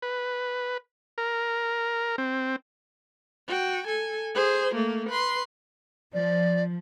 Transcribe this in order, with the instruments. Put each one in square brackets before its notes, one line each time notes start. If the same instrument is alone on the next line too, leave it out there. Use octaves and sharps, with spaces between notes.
[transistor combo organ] B4
A#4
C4
[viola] F#4 G5
A4 G#5
G#4 C5
A3 A#3
B4 C6
[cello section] F3 [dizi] D5